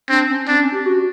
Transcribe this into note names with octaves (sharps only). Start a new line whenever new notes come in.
C4 D4
C#4
C4 D4
C#4
G4
F#4